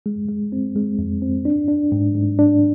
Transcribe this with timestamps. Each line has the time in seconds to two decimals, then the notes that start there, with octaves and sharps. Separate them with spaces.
0.06 G#3
0.28 G#3
0.52 C4
0.76 G#3
0.99 F2
1.22 C4
1.45 D4
1.68 D4
1.92 G#2
2.15 G#2
2.39 D4